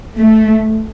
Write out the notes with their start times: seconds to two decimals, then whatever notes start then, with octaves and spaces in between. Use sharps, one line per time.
0.17 A3